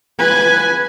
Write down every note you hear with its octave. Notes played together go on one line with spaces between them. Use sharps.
B4 G#5